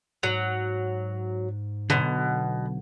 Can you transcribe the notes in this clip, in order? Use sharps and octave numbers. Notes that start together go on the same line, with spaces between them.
G#2 F#3
B1 B2 D3